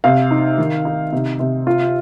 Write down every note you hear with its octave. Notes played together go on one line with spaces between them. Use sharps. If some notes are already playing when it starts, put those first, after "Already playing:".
C3 F5
D#4
D#3
D#4
C3
C3
F4